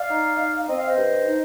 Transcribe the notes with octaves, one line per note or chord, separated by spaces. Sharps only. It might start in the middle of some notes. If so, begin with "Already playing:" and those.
Already playing: D5 F5
D#4
D#4
C4 D#5
F5
C5 D#5
G2
D#4